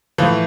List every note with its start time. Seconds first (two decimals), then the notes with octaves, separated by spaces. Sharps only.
0.18 A2 E3 F3